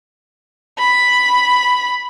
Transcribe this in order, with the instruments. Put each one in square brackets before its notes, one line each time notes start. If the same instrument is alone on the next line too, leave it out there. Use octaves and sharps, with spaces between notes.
[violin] B5